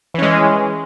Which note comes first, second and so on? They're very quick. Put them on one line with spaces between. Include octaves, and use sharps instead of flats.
E3 C#4 G#3